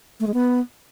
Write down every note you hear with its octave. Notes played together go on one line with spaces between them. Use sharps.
A3
G#3
B3